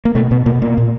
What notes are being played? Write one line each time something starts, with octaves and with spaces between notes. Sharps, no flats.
A#3
B2 A3
B2 B3
B2 A#3
B2 A#3
A#2